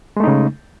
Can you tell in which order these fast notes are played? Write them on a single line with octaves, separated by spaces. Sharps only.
G#3 A3 D#4 C#3